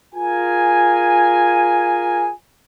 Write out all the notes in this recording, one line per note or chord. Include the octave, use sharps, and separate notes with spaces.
F4 G#4 A#4 G#5